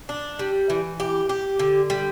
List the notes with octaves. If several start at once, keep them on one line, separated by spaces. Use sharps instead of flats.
D4
G3
E3
G4
G4
D3
G3